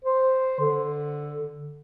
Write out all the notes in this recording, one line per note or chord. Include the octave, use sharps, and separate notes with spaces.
C5
D3